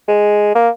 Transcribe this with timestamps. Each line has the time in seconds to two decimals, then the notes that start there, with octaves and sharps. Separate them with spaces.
0.08 G#3
0.55 A#3